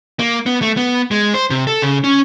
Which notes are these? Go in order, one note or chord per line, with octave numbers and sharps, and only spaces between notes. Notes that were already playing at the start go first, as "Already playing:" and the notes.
A#3
B3
A3
B3
G#3
C5
C3
A4
C#3
C#4